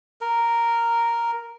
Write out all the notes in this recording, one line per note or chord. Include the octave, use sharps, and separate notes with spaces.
A#4